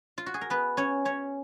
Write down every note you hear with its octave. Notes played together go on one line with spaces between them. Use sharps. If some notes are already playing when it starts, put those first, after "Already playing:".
F4
F#4
G#4
A#4
B3 B4
C#4 C#5
C#4 C#5